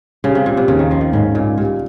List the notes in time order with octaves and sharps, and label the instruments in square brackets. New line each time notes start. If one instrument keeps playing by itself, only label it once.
[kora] C#3 [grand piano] G3
[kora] C3
[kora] A#2 [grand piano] G3
[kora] C3
[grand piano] D#2 [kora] C#3
[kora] D#3
[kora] F3 [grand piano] C#4
[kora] D#3
[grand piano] G#2 [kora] C#3
[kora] A#2 [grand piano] C#4
[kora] A#2 [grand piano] G3